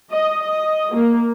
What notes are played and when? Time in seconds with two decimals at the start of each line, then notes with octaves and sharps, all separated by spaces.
0.11 D#5
0.42 D#5
0.93 A#3